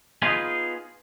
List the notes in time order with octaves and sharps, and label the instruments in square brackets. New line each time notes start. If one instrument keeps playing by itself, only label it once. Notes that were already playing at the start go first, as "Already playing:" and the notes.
[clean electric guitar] B3 D#4 F4 G#4 B4